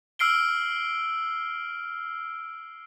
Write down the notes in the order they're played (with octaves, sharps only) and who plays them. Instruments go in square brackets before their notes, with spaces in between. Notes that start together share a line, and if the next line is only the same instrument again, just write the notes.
[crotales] E6 F6 C7 D7 G7